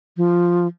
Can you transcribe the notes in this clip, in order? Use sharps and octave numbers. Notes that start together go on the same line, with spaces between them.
F3